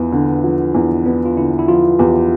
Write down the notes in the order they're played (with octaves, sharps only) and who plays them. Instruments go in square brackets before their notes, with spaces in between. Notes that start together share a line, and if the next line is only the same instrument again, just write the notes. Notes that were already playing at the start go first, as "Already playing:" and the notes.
Already playing: [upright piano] E2 F3 B3 [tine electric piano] E4 F4
[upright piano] D3
F3
E2
[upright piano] B3 [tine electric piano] D4
[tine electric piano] F4
[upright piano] D3 [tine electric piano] E4
[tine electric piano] E4
[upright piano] F3 [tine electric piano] F4
[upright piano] E2 [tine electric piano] G4